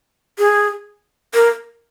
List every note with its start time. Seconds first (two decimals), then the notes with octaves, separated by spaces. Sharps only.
0.39 G#4
1.34 A#4